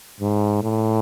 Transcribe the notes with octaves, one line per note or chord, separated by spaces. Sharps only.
G#2
A2